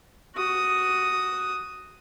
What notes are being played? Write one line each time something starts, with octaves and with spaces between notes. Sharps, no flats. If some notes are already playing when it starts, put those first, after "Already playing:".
F#4 D#6